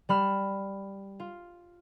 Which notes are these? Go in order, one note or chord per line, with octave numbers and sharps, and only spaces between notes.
G3 B5 F6 E7
F4